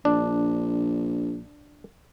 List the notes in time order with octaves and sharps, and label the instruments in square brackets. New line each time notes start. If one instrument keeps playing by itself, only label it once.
[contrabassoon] A#1 [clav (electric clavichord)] D4